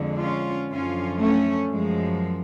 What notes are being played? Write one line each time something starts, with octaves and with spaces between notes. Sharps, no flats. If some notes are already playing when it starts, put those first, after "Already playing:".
Already playing: F2 D3 G#3
C#4 F4
F#2 D3 F3 C#4 F4
A3 C#4
F#2 F3 G#3